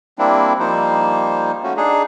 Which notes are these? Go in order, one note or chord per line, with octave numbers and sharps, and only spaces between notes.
G3 A#3 C4 D4 E4
F3 G3 A#3 D#4 C5
A3 C#4 F#4
D4 D#4 G#4